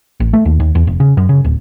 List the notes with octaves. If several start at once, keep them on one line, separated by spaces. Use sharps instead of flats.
A1
A3
D#2
D#2
E2
F1
C#3
F#2
C#3
D1